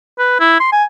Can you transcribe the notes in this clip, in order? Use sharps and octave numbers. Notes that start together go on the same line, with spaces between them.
B4
E4
C6
G#5